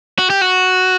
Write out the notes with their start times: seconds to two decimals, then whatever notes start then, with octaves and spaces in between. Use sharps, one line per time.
0.19 F#4
0.30 G4
0.41 F#4